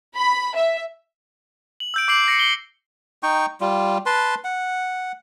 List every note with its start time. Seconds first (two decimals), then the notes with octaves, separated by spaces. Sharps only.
0.16 B5
0.55 E5
1.80 F#7
1.94 E6 G6 D7
2.08 D6 G6 C7 D7 F#7
2.27 G6 A#6 C7 C#7
2.39 G7
3.23 D#4 G5 C#6
3.61 G3 F4
4.06 B4 A5 C6
4.44 F#5